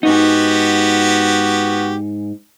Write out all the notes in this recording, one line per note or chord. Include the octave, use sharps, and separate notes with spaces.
G#2 B3 D#4 F#4 G4